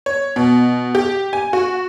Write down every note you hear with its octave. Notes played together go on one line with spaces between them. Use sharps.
C#5
B2
G4
G#5
F#4